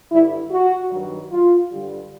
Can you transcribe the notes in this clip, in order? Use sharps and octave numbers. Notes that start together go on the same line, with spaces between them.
G2 D3 G3 E4
F#4
G2 D#3 F#3
F4
G2 D3 G3